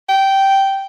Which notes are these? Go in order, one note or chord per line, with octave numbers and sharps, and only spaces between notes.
G5